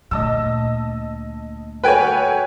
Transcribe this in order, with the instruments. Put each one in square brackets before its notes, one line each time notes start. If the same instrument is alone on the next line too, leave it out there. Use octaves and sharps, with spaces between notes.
[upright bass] D2 A#2 [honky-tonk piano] D#5 A5 E6
[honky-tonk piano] F#4 A4 C#5 [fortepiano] B4 G5 G#5